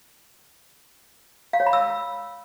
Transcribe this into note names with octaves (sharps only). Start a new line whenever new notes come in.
F5
C#5
B5
E6